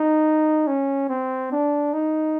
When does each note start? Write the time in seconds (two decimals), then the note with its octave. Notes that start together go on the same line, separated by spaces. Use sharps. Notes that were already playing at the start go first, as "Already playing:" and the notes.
Already playing: D#4
0.67 C#4
1.09 C4
1.52 D4
1.93 D#4